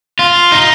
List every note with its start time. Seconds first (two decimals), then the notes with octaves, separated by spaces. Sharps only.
0.19 F4
0.52 D#4